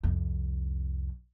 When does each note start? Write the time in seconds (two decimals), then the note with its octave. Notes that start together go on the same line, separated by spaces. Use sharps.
0.03 C2 F2